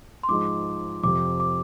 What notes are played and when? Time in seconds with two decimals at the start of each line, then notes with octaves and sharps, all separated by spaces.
0.23 C6
0.28 G#2 F3 G#3 D#4 D6
1.03 F2 C3 F3 C4 D6
1.40 D6